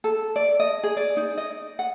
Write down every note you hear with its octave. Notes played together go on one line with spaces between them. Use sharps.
A4
D5
D#5
G#4
D5
D#4
D#5
F#5